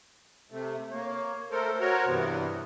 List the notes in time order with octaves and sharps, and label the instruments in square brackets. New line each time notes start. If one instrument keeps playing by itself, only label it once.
[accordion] C3 A3
[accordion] A#3 [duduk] C#5
[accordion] A3 A4 A#4 [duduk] C5
[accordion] F#4 A#4 C#5
[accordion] G2 E3 B3 [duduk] C3